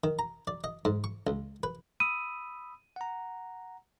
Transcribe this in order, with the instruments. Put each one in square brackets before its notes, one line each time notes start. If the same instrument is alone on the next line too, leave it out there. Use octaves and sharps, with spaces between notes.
[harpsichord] D#3
A#5
D5
D#5
G#2
C#6
C#2
B4
[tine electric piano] B5 D#6 E6 [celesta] D#7
[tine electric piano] F#5 A#5